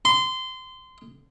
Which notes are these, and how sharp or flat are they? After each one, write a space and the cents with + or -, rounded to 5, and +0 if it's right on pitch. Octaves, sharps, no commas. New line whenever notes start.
C6 -20